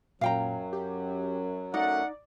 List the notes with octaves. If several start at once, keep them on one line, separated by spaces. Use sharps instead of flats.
F#2 A#2 F#3 F5 G5 A#5
G4
A3 D#4 D5 F#5